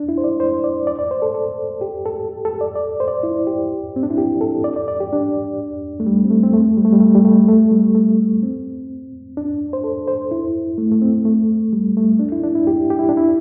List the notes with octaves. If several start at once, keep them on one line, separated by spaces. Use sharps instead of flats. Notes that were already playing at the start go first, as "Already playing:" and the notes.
Already playing: D4
E4
C5
D5
C5
D5
D5
D5
C5
A4
A4
G4
A4
G4
A4
D5
D5
C5
D5
E4
G4
C4
D4
E4
G4
A4
D5
D5
D5
G4
D4
A3
G3
C4
A3
C4
A3
G3
A3
G3
A3
G3
A3
A3
G3
A3
C4
D4
C5
A4
C5
E4
A3
A3
C4
A3
G3
A3
D4
E4
D4
E4
G4
G4
E4
D4
E4